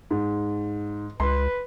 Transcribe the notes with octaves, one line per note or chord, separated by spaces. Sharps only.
G#2
C#2 B4 C6